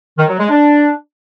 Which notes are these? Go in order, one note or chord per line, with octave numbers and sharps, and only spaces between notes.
D#3
F#3
G#3
D4